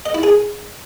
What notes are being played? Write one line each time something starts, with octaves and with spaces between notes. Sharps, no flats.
D#5
E4
G#4